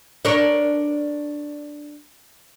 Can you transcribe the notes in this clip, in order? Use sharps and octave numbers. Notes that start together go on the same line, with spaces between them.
D4 A#4 C#5